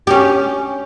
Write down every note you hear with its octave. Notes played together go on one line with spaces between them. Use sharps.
C#4 G4